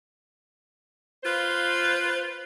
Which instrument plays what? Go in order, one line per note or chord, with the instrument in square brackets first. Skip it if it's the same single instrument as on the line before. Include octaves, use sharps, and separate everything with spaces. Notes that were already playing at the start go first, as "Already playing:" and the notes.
[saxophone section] F4 B4 C5 F5